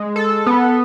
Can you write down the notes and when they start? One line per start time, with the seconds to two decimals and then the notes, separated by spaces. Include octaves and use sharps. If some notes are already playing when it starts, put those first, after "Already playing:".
Already playing: G#3
0.16 A4
0.46 B3